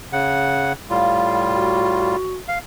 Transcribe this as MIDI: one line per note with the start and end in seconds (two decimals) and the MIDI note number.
0.13 0.73 49
0.13 0.73 78
0.90 2.16 45
0.90 2.16 55
0.90 2.16 65
0.90 1.35 77
1.53 2.35 66
2.48 2.58 77